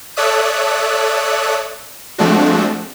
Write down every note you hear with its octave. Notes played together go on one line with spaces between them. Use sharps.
A4 C#5 D5 E5 D#6 F#6
F3 G#3 A3 C4 D4 F#4